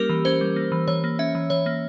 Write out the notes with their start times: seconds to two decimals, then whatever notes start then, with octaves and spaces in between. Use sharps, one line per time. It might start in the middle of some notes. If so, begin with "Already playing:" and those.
Already playing: G3 A#3 C#4 G4 A#4
0.09 E3
0.25 C#4 C5
0.41 G3
0.56 A#3
0.72 E3
0.88 E3 C#5
1.04 A#3
1.19 C#4 E5
1.35 E3
1.50 E3 C#5
1.66 A#3